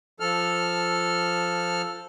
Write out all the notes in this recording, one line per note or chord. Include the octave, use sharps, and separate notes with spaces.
F3 A4 F6